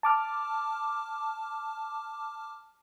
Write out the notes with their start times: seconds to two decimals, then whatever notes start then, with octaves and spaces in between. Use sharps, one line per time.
0.03 A5 D6 F6